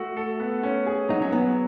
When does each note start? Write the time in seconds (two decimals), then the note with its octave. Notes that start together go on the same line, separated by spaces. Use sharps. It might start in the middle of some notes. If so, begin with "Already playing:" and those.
Already playing: A3 F#4
0.17 A4
0.40 B3
0.63 C#4
0.86 G#4
1.09 F#3 D#4
1.22 C#4
1.32 F#3 B3